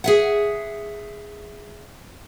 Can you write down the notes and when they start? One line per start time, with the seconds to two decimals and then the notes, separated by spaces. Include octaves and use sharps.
0.04 G#4 E5 F#5